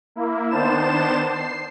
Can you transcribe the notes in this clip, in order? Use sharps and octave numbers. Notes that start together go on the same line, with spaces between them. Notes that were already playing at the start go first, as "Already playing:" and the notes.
A#3 E4
D#3 B3 D4 C5 A5 E7
C7